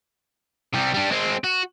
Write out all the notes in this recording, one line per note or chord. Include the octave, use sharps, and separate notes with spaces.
C3 G3
G3 D4
G#3 C4
F#4